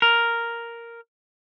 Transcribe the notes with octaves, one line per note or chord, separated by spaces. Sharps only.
A#4